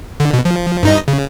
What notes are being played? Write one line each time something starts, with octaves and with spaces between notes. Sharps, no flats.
D3
B2
F3
G2 D#4 D#5
C#3